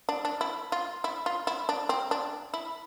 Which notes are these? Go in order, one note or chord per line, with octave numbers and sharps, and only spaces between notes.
D4
D4
E4
F4
E4
F4
E4
D4
C4
D4
E4